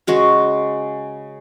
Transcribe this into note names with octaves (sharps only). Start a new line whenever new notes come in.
C#3 G#3 F#4